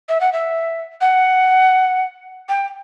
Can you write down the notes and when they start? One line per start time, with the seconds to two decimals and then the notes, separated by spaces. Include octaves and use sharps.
0.09 E5
0.21 F#5
0.33 E5
1.01 F#5
2.49 G5